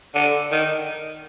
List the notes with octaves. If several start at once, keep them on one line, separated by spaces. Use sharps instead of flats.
D3
D#3